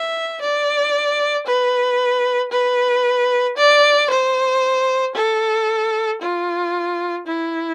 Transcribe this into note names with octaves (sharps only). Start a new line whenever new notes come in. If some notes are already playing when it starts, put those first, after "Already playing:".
Already playing: E5
D5
B4
B4
D5
C5
A4
F4
E4